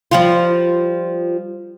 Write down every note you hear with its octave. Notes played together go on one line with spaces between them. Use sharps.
F3 G3 F4